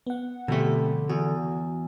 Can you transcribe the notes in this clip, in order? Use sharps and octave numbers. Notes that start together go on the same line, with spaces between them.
B3 F#5
F2 B2 D3 F3 A3 G4
E2 F#4